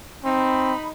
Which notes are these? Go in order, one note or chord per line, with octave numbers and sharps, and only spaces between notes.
C4 D#4 B5